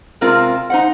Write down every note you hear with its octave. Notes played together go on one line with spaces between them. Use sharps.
C3 G#3 C4 F4 A#4
D#4 C5 F#5